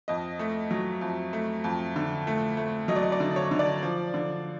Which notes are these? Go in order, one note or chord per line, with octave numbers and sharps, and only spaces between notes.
F2 D#5
A3
F#3
F2
A3
F2
D3
A3
A3
F#3 D#5
D5
D#5
D5
D3
C#5
D3
D5
F3
D3